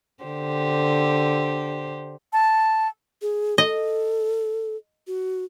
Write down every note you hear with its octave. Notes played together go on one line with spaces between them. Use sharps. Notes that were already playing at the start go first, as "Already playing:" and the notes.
D3 G4 C5
A5
G#4
A4 D#5
F#4